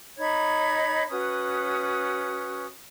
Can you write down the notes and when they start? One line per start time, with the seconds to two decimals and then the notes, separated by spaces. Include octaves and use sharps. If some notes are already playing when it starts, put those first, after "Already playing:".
0.18 D#4 C#5 B5 G#6
1.10 C#4 F#4 B4 D#6